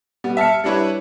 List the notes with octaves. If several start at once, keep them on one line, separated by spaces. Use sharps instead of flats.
G3 B3
E5 A5 F6 C#7
G3 D4 E4 B4 C#5